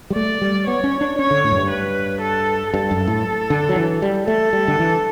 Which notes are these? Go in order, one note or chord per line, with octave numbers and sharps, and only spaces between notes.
G3
A3 D5
G3
B3 C#5
C#4
D4
C#4 C#5
D3
A2
F#2
G2
B4
A4
G2 A4
F#2
A2
D3
F#3
E3
G3
A3 A4
G3
D3
E3